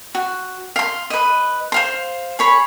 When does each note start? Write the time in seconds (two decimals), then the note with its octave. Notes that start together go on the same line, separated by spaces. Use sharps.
0.15 F#4
0.76 F5 C6
1.10 B4 D#5
1.72 C5 F5 C6
2.39 G#4 C#5 B5